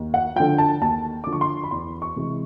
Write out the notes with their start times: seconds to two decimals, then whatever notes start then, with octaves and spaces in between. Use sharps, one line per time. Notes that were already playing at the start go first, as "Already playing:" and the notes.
Already playing: D#2
0.14 F#5
0.36 D3 F3 G5
0.58 A5
0.81 D#2 A5
1.24 D3 F3 D6
1.33 C#6
1.41 C6
1.64 B5
1.71 E2 C6
2.02 C#6
2.16 C3 E3 G#3